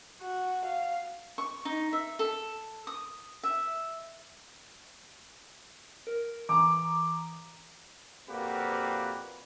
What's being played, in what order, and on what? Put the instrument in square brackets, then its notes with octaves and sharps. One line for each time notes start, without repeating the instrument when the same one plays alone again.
[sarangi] F#4
F5
[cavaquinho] C#6
D#4
E5
A4
D#6
E5
[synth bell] A#4
[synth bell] E3 A#5 D#6 [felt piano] D6
[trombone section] F2 A#2 C4 F#4 G4 B4